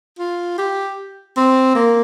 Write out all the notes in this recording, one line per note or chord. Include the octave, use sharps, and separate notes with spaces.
F4
G4
C4
A#3